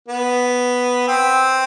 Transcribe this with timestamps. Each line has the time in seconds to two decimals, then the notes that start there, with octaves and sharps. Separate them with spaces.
0.08 B3
1.08 C4